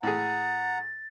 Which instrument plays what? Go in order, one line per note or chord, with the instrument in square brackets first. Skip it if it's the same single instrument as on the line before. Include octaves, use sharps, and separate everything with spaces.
[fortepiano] A2 G#4 [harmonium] F#5 A#5 [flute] A6